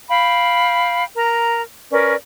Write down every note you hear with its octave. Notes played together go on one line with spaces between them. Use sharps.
F5 G5 B5
A#4 A#5
C#4 A#4 B4 D5